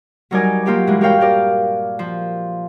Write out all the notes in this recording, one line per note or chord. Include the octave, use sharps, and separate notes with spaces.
F#3 G3 D#4 A#4 D5 G#5
F#3 A#3 F4 G4 A#4 D5
G2 A#2 E3 G#3
G4 A#4 C#5 F5 G5
G4 A#4 D5
F3